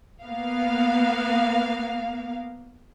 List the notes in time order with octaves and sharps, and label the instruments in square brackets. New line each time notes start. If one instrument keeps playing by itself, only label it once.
[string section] A#3 B3 F5